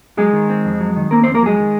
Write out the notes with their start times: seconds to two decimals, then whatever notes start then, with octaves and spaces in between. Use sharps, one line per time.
0.17 F#3 G#3 G#4
0.33 D#3
0.50 C4
0.65 F2
0.80 F#3
0.97 D#3
1.11 A#3 C4 A#4
1.23 F2 C4 C5
1.34 A#3 A#4
1.43 F#3 G#3 G#4
1.59 D#3